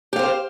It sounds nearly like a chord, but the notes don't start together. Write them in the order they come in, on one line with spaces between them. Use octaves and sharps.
G4 F5 C5